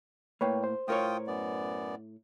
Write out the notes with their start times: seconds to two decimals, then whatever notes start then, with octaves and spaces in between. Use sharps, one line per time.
0.41 A2 A#3 B4 C#5 G5
0.64 C5
0.88 A2 F4 A#4 C#5 G5 D#6
1.27 F#2 B3 D5